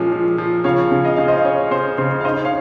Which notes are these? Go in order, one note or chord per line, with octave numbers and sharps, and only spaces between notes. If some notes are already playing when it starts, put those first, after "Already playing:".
Already playing: A#2 F3 G#3 C#4
F3
F3
C#3 C#5 F5
C#3
D#5
C#3 F5
C5 D#5
C#4 C#5
C#3 C5
C#3 C5
F5
D#4 C5 D#5
C#5 F5